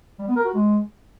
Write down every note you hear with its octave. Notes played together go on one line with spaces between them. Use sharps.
G3
B3
A#4
F#4
G#3